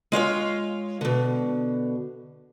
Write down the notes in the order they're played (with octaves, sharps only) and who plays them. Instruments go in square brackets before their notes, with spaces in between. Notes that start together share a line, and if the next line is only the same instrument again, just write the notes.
[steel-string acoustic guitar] G#3 F4 C#5 F5
B2 D3